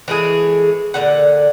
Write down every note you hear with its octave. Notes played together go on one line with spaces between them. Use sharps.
E3 G#3 A3 G#4
A#2 D3 F#5